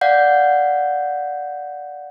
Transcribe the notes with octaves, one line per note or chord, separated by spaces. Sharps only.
D5 F5 F#5 G6